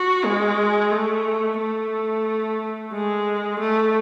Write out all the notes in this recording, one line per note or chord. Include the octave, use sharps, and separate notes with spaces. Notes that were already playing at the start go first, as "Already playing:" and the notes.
Already playing: F#4
G#3
A3
A3
G#3
A3